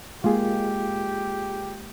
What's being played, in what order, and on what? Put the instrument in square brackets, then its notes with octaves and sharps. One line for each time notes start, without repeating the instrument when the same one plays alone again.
[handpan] G#3 A#3 [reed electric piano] F4 G#4 [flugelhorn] G4